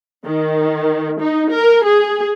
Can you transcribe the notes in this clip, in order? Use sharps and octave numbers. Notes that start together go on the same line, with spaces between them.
D#3
D#4
A#4
G#4